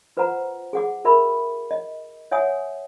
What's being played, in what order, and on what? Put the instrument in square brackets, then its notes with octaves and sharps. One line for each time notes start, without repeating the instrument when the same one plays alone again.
[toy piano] F4 B4 C5 F#5 A#5
G#4 F#5 D6
F#4 A#4 E5 B5
D#5
C#5 E5 F#5 G#5 D#6